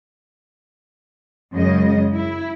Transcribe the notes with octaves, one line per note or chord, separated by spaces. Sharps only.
F#2 C#3 G#3 D#5
E4